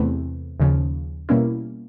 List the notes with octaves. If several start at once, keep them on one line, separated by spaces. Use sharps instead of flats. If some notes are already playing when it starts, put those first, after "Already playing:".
Already playing: E2 C3 E3 A3 C4
D#2 C#3 F3
B2 G3 A#3 C#4 E4